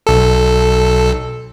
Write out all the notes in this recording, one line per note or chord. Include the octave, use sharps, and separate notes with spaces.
B1 A4